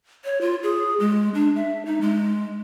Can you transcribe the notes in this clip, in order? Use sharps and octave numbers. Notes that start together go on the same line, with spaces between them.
C#5
F4
G#4
G#3
D4
E5
D#4
G#3